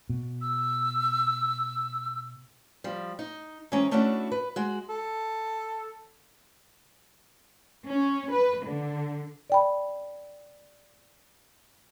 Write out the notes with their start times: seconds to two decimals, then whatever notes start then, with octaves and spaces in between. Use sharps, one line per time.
0.09 B2
0.41 E6
2.84 F3 G3
3.19 D#4
3.72 E3 G#3 C4 C#4 A#5
3.91 A3 C#4 D4 E4 F#4
4.32 B4
4.56 G#3 F#4
4.89 A4
7.86 C#4
8.31 B4
8.65 D3
9.50 D5 G5 B5